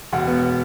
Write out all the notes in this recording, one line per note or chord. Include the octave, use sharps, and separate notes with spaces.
E1 F#5
B3